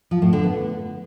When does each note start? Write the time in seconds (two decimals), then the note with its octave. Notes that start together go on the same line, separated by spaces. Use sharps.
0.11 F3
0.22 A2
0.33 D3
0.44 B3